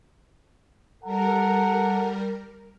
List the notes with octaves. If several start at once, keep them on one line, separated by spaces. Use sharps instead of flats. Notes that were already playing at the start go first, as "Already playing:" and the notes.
G3 A4 A#4 F#5 A#5